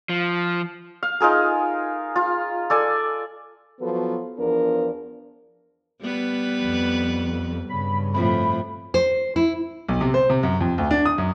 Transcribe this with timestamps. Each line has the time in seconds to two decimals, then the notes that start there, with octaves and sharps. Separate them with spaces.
0.09 F3
1.03 F5
1.21 D#4 F4 G#4 A#4
2.16 F4
2.70 A4 D5 G#5
3.80 F3 F#3 B3 F#4 A4 B4
4.39 E2 F3 B3 D4 A#4
6.01 G3 B3 B4
6.62 F2
7.69 G2 C#3 B5
8.14 F2 A2 B5
8.94 C5
9.36 E4
9.88 B1
10.01 C3
10.14 C5
10.30 C3
10.43 F#2
10.61 F2
10.78 D2
10.91 D4
11.06 D#6
11.18 F#2